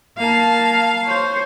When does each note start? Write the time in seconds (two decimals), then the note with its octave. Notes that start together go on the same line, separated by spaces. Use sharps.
0.18 A#3 F5 A5
1.05 C5 C#5